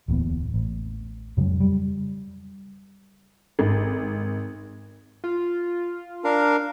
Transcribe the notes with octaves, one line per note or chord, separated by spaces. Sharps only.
D1 E2 A#3 B3
A1
F2 C#3 F#3 G#3
G3
G#1
F4
D4 A#4 F5